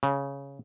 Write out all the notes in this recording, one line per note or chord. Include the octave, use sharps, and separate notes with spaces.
C#3